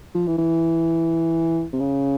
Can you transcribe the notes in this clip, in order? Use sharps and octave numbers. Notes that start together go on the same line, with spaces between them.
F3
E3
E3
C3
C#3